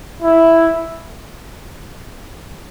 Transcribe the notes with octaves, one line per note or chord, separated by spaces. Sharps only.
E4